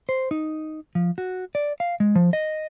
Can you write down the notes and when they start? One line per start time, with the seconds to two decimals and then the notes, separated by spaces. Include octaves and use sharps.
0.09 C5
0.31 D#4
0.95 F3
1.18 F#4
1.55 D5
1.80 F5
2.00 G#3
2.15 F3
2.33 D#5